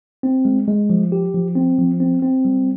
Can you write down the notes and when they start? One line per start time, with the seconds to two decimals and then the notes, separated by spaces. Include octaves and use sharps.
0.23 C4
0.45 G#3
0.68 G#3
0.90 F3
1.12 G4
1.34 F3
1.55 C4
1.78 F3
2.00 C4
2.22 C4
2.45 G3